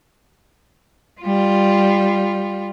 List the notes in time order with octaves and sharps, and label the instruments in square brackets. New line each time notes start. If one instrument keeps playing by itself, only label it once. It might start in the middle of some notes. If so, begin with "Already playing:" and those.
[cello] G3 F4